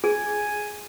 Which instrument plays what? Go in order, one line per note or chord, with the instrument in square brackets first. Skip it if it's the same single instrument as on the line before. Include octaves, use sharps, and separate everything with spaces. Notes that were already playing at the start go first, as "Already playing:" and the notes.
[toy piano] G#4 [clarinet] G#5